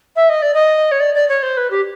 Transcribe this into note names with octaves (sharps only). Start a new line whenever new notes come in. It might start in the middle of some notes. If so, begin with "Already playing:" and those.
E5
D#5
D5
D#5
C#5
D5
D5
C#5
C5
B4
G4